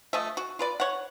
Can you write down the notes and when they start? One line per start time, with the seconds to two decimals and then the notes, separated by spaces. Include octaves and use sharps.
0.13 F3 A3 D#5 E5
0.37 F#4
0.59 F4 B4 D5
0.80 C#5 F#5